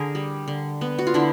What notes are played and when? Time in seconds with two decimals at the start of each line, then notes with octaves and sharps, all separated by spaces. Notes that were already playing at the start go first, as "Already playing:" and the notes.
Already playing: D3 G#4 A#4
0.15 G3
0.48 D3
0.81 B3
0.99 F#4
1.07 F4
1.14 D3 D4 E4